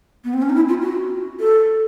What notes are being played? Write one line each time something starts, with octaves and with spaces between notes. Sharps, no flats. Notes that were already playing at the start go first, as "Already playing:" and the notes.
B3
C4
C#4
D#4
E4
F4
F#4
A4